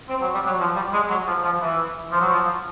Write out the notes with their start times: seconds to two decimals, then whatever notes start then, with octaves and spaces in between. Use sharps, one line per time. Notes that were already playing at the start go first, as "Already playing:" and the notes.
0.09 C4
0.21 F#3
0.34 G3
0.46 F#3
0.60 F3
0.76 G3
0.93 G#3
1.09 F#3
1.27 F3
1.44 F3
1.61 E3
2.11 F3
2.20 F#3
2.29 F3